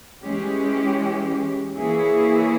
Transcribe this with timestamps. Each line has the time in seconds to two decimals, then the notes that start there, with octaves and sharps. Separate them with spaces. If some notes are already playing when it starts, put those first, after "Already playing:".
0.22 E3 G#3 C#4 G4
1.76 E3 A#3 E4 G#4 C#5